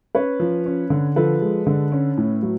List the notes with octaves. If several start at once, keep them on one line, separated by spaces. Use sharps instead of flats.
C#4 B4 C#5
F3
C#4
D3
F3 A4 B4
G#3
D3
C#4
A2
F#3